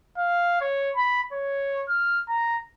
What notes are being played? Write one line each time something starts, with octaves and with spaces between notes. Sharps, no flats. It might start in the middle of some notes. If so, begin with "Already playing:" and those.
F5
C#5
B5
C#5
F6
A#5